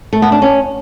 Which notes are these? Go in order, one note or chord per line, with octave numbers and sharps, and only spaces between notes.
A3
B3
D4
C#4